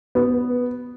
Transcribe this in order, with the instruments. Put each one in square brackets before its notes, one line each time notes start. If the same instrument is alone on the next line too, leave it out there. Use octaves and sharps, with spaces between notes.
[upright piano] B3